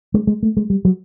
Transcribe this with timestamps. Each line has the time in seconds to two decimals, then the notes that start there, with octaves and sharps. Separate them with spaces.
0.14 G#3
0.27 G#3
0.43 A3
0.57 G#3
0.70 G3
0.85 F#3